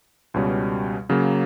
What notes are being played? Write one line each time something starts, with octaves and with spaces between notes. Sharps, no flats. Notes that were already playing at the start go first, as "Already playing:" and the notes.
C#2 B2 G3 C#4
C#3 F#3 A#3